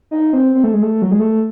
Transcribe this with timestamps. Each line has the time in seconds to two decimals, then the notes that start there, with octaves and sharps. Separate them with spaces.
0.11 D#4
0.33 C4
0.55 C4
0.64 A3
0.73 G#3
0.82 A3
1.02 F#3
1.12 G#3
1.20 A3